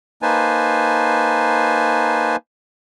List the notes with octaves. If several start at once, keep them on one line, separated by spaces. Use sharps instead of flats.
A#3 D#4 B4 C5 G#5 A5